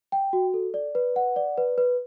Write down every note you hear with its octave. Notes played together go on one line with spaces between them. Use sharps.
G5
F#4
A4
D5
B4
F#5
D5
B4
B4